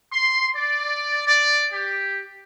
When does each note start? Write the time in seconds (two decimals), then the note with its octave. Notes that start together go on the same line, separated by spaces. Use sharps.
0.13 C6
0.56 D5
1.27 D5
1.72 G4